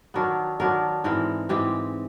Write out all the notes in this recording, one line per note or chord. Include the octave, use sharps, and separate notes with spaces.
D#3 F#3 B3 D4 A#4
D#3 F#3 B3 D4 A#4
G#2 E3 G#3 C4 A#4
G#2 E3 G#3 C4 G4